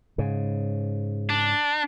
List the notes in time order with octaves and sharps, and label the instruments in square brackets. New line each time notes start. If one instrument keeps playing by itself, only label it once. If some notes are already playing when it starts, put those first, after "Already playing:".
[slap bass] G#2 C#3
[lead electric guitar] D4